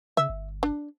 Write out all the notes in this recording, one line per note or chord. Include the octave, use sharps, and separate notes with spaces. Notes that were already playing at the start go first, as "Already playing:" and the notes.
C#3 E5
G1
D4